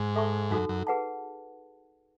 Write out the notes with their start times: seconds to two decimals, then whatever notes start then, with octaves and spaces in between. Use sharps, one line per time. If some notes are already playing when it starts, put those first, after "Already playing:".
Already playing: G#2
0.15 A4 E5 A5 C#6
0.51 F#2 D#4 F#4 A4
0.69 F#2
0.87 G#4 B4 F#5 A5